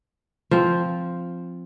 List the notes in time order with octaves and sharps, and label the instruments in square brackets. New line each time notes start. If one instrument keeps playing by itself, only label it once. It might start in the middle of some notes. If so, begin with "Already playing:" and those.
[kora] F3 C4